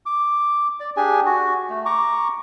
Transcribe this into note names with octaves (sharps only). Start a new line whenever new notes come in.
D6
D5
D4 G4 G#4 G#5
F#4
A3
A#5 C#6 D6